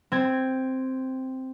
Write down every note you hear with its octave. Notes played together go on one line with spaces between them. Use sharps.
C4 G#6